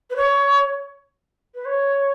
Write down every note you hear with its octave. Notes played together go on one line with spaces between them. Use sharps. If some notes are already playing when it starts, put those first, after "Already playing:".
B4
C#5
B4
C#5